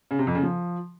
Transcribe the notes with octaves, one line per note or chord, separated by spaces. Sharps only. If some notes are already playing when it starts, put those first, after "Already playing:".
C#3
C3
F2
C#3
F3